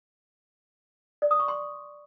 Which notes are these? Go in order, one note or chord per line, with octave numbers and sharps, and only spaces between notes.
D5
D#6
C#6
C6